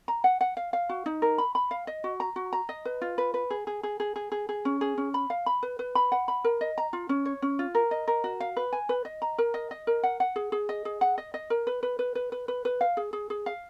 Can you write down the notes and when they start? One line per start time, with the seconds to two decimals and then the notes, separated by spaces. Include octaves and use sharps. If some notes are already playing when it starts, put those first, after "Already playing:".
0.08 A#5
0.24 F#5
0.41 F#5
0.57 F5
0.73 F5
0.89 F#4
1.06 D#4
1.22 A#4
1.38 B5
1.55 B5
1.71 F5
1.87 D#5
2.04 F#4
2.20 A#5
2.36 F#4
2.53 A#5
2.69 D#5
2.85 B4
3.02 F4
3.18 B4
3.34 B4
3.50 G#4
3.67 G#4
3.83 G#4
4.00 G#4
4.16 G#4
4.32 G#4
4.49 G#4
4.65 C#4
4.81 G#4
4.98 C#4
5.14 B5
5.30 F5
5.46 B5
5.63 B4
5.79 B4
5.95 B5
6.12 F#5
6.28 B5
6.44 A#4
6.61 D#5
6.78 A#5
6.93 F4
7.09 C#4
7.25 C#5
7.42 C#4
7.59 F4
7.75 A#4
7.91 D#5
8.08 A#4
8.24 F#4
8.40 F5
8.57 B4
8.73 G#5
8.89 B4
9.05 D#5
9.22 A#5
9.38 A#4
9.54 D#5
9.71 D#5
9.87 A#4
10.03 F#5
10.20 F#5
10.36 G#4
10.52 G#4
10.69 D#5
10.85 G#4
11.01 F#5
11.18 D#5
11.34 D#5
11.50 A#4
11.67 B4
11.83 B4
11.99 B4
12.15 B4
12.32 B4
12.48 B4
12.65 B4
12.81 F5
12.97 G#4
13.13 G#4
13.30 G#4
13.46 F5